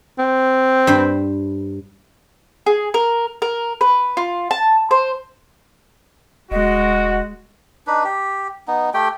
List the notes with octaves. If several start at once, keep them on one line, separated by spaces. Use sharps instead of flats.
C4
G2 C5 B5
G#4
A#4
A#4
B4
F4
A5
C5
D#1 G#3 F#4 D#5
D4 D#4 B4
G4
B3 D#4
A3 G4 G5